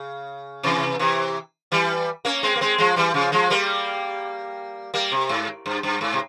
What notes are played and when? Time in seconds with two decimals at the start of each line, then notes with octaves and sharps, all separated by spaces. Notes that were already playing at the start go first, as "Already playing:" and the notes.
Already playing: C#3
0.63 C3 E3
0.99 C3 E3
1.72 E3 G3
2.25 A#3 C#4
2.43 G#3 C4
2.56 A#3
2.61 G#3 C4
2.78 F3 G#3
2.96 E3 G3
3.14 C#3 F3
3.32 F3 G#3
3.50 G3 A#3
4.94 G3 A#3
5.12 C3
5.29 G#2
5.66 G2
5.83 G2
6.01 G#2
6.13 C3